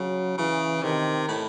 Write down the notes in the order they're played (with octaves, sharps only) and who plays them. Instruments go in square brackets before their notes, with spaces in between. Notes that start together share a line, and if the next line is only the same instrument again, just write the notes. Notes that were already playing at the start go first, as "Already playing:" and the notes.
Already playing: [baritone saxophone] C#3 [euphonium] F#3
[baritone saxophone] C#3 [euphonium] E3
[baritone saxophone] C3 [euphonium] D#3
[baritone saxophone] A2